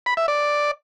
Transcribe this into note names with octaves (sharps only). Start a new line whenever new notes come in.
B5
E5
D5